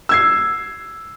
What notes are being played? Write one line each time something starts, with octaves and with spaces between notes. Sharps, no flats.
E6 G#6 C7